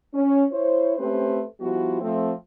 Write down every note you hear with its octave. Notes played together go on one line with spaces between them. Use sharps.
C#4
E4 C5 C#5
A3 C4 C#4 G4 B4 C5
F3 G3 B3 E4 F#4
F3 A3 C4